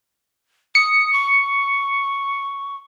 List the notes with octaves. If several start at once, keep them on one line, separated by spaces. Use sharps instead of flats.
D#6 C#7
C#6